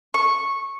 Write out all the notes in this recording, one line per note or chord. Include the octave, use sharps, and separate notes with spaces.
C#6